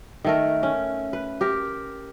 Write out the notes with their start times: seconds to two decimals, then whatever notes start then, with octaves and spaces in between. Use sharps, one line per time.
0.25 D#3 A3 A#4
0.63 C#4
1.13 B4
1.41 G4 A#4